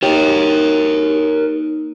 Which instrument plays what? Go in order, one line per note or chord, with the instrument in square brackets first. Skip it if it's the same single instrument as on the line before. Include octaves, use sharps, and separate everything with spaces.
[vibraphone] A#3 D#4 [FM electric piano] G4 [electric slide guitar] A#4 C#5